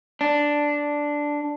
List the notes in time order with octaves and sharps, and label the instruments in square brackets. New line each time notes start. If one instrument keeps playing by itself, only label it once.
[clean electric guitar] D4